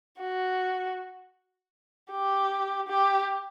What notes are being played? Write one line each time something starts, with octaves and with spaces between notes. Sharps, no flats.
F#4
G4
G4